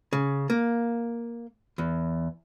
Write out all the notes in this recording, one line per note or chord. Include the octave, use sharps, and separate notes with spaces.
C#3
A#3
E2